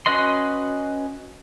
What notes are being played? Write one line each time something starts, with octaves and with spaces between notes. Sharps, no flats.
C#4 F#4 B4 D#5 C6